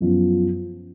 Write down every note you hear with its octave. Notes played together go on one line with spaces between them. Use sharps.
F#2 F3 B3